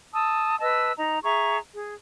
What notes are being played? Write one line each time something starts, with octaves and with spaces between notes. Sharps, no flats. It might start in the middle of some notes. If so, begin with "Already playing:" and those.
A5 D#6 E6
B4 D#5 A5 E6
D#4 D#5 A#5
G#4 E5 A#5 C#6
G#4